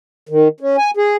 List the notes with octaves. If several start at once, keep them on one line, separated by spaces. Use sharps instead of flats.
D#3
C#4
G#5
G#4